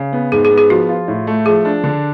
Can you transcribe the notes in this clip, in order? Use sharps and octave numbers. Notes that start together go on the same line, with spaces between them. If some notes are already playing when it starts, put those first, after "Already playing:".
Already playing: C#3
B3
G#2 G#4
G#4
B3
G#4
F3 F#4
F4
A2
A3
F3 G#4
D4
D3